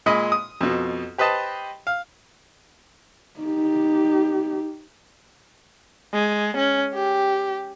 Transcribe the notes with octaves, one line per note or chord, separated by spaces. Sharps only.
A#2 G#3 D#5 B5
D#6
F2 B2
G4 B4 C5 D#5 A5
F5
D#4 G4
G#3
C#4
G4